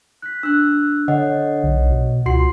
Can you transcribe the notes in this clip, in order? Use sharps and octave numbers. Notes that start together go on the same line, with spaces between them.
F#6 B6
D4 E6 F#6
D3 C#5 D#5 F#5
B1
B2
C#2 F4 F#4 F#5 C6 C7